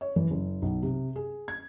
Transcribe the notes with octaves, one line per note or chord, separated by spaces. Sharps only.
C#5
E3
F#1
B1
C3
G#4
G#6